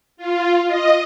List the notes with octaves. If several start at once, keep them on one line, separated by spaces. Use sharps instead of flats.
F4
D#5